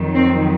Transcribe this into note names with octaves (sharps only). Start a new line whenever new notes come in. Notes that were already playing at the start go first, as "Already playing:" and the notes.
Already playing: F2 D#3 F#3
C4